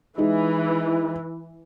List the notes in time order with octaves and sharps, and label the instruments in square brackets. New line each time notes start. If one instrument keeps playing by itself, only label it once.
[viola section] E3 [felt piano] G#3 D#4